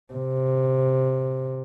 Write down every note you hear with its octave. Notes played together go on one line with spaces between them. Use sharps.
C3